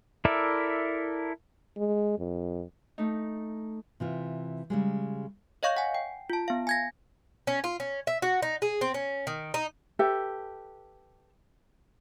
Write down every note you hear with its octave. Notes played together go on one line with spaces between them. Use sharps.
E4 A4 A#4 D5 E5
G#3
F2
A3 D#4
C3 E3 F4
C#3 G3 G#3
C#5 D#5 F5 C#6 G6
F#5 G#5
G5
F4 A5
B3 F5
G#5 G#6 A#6
C#4
F4
C#4
E5
F#4
D#4
G#4
C4
C#4
D#3
D#4
G4 A4 B4 E5